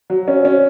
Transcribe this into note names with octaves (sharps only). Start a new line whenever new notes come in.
F#3
C#4
C#4